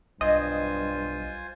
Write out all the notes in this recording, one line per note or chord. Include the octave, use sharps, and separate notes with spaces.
B1 G2 F4 C5 D#5 G#5